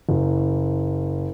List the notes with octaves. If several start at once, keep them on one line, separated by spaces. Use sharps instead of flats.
F#1